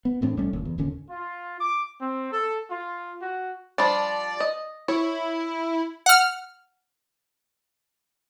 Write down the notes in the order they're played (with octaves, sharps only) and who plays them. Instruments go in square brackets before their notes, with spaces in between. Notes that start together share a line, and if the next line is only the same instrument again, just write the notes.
[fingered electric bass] B3
E2 A2 C4 D4
B1 G3 A3 C#4
F#1 D#2 A#2
E2
D1 D#2 D3 C#4
[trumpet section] F4
D6
C4
A4
F4
F#4
[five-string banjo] F3 G3 D4 [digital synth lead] D5
[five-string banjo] D#5
[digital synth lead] E4 [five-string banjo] C#5
[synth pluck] F#5 F6